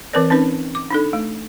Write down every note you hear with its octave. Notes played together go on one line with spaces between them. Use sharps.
E3 C4 A#4 B4 D5
C4 C#4 D#4 B4
D6
D4 D#4 A4
A3